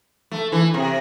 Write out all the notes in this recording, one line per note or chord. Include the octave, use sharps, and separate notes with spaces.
A3
E3
C3